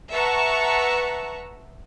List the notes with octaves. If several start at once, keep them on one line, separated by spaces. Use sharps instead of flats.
B4 E5 F#5 A5 A#5 C#6